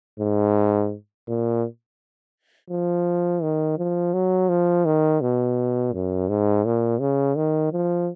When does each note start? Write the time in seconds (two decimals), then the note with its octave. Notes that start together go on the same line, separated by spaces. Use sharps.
0.20 G#2
1.27 A#2
2.70 F3
3.43 D#3
3.78 F3
4.14 F#3
4.49 F3
4.85 D#3
5.21 B2
5.93 F#2
6.29 G#2
6.65 A#2
7.00 C#3
7.37 D#3
7.72 F3